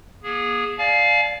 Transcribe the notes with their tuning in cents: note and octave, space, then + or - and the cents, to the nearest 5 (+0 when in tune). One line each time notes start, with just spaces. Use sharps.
A#3 +40 G#4 -10
D5 +0 F5 +0 G#5 +40